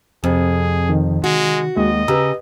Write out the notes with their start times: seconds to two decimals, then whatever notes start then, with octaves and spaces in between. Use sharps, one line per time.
0.24 F2 C3 G#4
0.90 D#3
1.24 G#3 F#4
1.77 D#2 G#3 D#5
2.08 C#3 G4 B4 A#5 E6